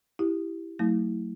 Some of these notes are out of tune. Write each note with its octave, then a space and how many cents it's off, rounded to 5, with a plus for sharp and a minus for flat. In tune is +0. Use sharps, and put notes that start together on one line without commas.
E4 +0 G4 +0
F#3 +10 A3 +40 E4 -20